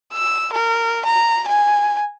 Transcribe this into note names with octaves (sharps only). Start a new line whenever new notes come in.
E6
A#4
A#5
G#5